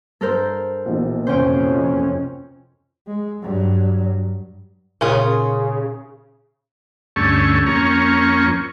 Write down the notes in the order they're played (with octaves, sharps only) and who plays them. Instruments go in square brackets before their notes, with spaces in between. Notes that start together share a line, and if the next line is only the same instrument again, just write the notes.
[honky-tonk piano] G2 [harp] A4 A#4 C5
[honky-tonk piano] A#1 B2 E3
[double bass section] F2 C3 F3 [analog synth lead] C#4 [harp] C5 G5
[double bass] G#3
G2 F#3
[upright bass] A#2 D#4 [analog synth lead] C#3 [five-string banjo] C#4 F4 G#4 [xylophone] A#4
[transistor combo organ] D2 G2 A3 C#4 C#6
F2 A#3 C#4 C#6